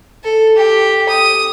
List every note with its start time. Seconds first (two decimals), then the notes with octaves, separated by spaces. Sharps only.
0.24 A4
0.57 G4
1.09 D#6